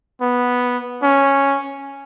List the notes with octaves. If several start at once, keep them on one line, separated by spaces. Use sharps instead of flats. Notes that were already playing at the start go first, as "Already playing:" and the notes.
B3
C#4